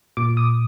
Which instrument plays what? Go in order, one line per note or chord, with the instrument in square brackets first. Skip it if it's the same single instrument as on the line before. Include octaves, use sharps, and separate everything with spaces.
[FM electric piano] A#2 D6
D#6